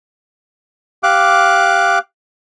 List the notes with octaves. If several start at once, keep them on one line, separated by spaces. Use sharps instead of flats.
G4 F5 D6 F#6